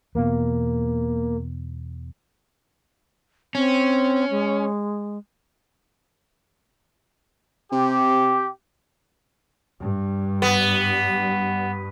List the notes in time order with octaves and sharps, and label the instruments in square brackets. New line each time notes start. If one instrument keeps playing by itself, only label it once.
[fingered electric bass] E2 B2 [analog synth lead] A#3
[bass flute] C4 [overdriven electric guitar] C#4
[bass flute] G#3
[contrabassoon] C3 [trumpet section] G4
[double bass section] G2
[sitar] B3